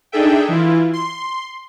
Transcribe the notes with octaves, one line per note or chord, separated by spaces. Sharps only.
D4 D#4 G#4 A4 E5 G5
E3 E4 F4
C6